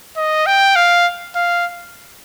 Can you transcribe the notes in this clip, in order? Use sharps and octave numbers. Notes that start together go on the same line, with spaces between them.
D#5
G5
F5
F5